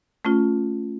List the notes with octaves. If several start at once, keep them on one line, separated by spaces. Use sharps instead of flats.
A3 C#4 F4